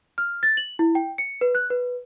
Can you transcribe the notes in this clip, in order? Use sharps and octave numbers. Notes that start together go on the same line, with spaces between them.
F6
A6
F#7
E4
G5
C#7
B4
F#6
B4